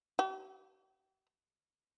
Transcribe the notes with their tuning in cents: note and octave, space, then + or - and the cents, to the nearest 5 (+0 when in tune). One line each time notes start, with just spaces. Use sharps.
G4 -45